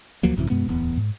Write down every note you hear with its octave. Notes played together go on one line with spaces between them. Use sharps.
D2 F3 F#3 A#3
G#1 F#2 C3 E3
F#2 B2 G#3 B3
D1 E2 B3
G#2